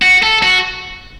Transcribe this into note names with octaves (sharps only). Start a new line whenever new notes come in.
F#4
A4
F#4